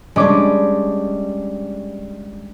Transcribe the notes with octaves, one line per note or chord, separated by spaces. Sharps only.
G3 G#3 C#4 D4 D6